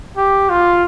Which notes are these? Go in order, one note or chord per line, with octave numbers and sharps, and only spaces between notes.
G4
F4